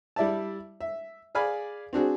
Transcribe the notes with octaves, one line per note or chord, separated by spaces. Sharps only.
G3 E4 D5 E5 A5
E5
G#4 D5 F5 G#5 B5
C4 D4 F#4 G#4